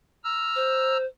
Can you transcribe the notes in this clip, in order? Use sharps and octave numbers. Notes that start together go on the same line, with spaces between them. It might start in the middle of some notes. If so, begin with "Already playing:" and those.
A#5 E6 F6
C5